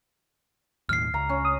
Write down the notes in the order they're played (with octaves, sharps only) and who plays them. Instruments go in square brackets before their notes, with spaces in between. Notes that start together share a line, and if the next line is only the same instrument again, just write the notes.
[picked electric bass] D#2 A2 D#3 [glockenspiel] F6 C7
[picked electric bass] C#2 [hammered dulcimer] A#5
[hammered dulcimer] C#4
[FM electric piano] D#6